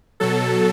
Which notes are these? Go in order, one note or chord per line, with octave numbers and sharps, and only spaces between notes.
B2 F#3 A4